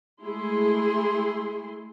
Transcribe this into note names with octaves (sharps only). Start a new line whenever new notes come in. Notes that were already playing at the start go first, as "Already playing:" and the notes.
G#3 A3 E4 G#4 C6